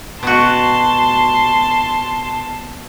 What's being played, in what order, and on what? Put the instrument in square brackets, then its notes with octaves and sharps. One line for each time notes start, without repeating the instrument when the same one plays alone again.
[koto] B2 F#4 [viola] A5 C6